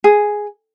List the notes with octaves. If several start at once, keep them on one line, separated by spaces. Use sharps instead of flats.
G#4